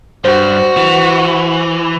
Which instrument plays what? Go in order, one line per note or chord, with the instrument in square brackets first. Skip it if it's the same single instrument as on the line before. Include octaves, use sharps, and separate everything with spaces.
[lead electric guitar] G2 [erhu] F#4 [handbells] C5
[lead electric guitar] E3